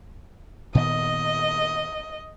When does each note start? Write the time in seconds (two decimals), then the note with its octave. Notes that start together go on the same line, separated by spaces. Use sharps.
0.75 A#2 D#3 B3 D#5